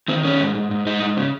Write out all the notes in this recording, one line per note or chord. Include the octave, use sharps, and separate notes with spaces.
D#3 C4
D#3 C#4
G#2
G#2
G#2
G#2 D#4
G#2
C#3